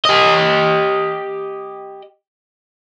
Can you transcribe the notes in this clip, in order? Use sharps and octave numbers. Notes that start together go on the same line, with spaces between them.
G4 D#5